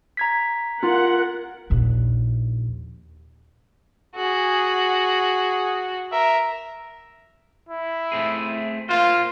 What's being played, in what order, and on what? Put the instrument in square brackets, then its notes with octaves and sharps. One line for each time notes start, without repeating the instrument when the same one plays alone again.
[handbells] A#5 G#6 B6
[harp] F4 [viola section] A#4 F#5
[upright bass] A#1 D#2
[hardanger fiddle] F#4 [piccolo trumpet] G#4
[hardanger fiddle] A#4 [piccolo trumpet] E5
[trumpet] E4
[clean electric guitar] A3 C4 G#4
[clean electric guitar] A#3 C5 [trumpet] F4